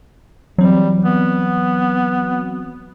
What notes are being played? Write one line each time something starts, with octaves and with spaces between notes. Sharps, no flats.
E3 F#3 G3 C4
B3